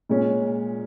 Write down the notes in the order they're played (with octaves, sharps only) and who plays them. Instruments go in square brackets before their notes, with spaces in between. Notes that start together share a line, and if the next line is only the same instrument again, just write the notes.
[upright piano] A#2 G#3 C#4